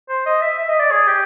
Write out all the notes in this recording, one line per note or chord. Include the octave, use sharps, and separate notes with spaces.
C5
D#5
E5
E5
D#5
D5
G#4
G4